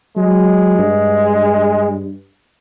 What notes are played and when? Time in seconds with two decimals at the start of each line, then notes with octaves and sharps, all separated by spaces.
0.17 F#3 G#3
0.78 G2